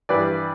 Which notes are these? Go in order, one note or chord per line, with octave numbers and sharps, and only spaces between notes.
G2 E3 B4 D5